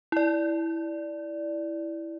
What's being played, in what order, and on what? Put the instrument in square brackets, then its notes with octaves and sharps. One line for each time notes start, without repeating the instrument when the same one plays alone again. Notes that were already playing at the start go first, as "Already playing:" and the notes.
[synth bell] E4 D5